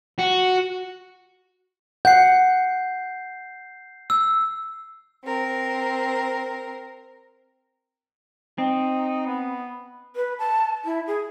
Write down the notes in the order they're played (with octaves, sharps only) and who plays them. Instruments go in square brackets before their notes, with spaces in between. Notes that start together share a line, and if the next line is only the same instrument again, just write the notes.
[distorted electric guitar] F#4
[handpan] F#5 [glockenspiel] G6 C7
[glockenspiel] E6
[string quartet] C4 A#4
[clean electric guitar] C4 [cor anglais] D#4
[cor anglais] B3
[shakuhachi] B4
A5
E4
G#4